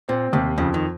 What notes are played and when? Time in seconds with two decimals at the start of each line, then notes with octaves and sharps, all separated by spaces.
0.09 A#2 C4
0.33 D#2 C3
0.58 F2 C#3
0.74 D#3